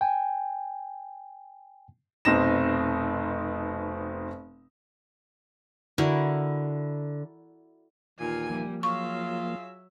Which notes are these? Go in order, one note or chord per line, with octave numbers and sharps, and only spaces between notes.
G5 G#5
F1 B2 C4 D#4 A#6 E7
D3 E4 F#4 A#4
D#2 A#2 E3 F4 G#5
F3 G3 A#3
F#3 F4 G#4 E5 F5 C#6